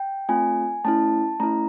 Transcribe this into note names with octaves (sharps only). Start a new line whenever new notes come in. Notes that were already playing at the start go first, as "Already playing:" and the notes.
Already playing: G5
A3 C4 F4 G#5
A3 C#4 E4 A5
A3 C#4 E4 A#5